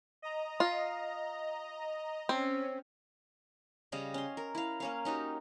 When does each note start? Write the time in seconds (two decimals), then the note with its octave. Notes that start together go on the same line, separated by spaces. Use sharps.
0.22 D#5 A#5
0.60 F4
2.29 C4 C#4
3.92 C#3 G3 D#5 F5
4.14 C#4 C6
4.37 A#4
4.55 E4 F5
4.80 A#3 C#4 F5
5.05 C#4 D#4 F#4 G4